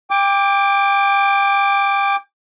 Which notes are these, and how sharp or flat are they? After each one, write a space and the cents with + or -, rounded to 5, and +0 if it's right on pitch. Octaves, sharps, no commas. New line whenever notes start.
G5 +30 D6 +0